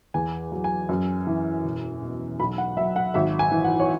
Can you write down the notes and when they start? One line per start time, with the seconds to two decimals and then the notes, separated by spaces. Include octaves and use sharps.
0.14 E2 G#5
0.52 F#3
0.64 G#5
0.89 F#2
1.27 E3
1.64 E1
2.02 B2
2.39 B1 B5
2.58 F#5
2.77 F#3 E5
2.96 F#5
3.14 G#1 E5
3.39 G#5
3.51 E3
3.64 F#5
3.80 C#5